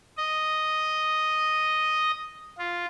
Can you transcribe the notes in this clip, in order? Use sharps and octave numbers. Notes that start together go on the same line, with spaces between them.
D#5
F4